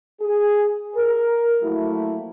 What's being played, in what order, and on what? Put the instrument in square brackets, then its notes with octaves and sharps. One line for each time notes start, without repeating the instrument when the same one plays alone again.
[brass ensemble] G#4
A#4
F3 F#3 A3 A#3 E4 F#4